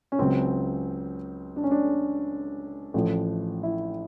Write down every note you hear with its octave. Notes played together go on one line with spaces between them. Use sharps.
C#4
C#2 C#3 F#3 C4
D4
C#4
D4
A1 A2 F3
E4